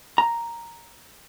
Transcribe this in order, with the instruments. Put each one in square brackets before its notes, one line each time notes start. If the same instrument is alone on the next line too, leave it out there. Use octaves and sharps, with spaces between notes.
[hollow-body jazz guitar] A#5